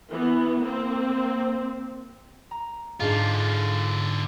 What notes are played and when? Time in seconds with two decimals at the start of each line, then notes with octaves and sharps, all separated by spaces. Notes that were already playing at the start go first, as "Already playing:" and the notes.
0.11 E3 B3
0.62 A#3 C4
2.51 A#5
3.01 G#2 D3 D4 F4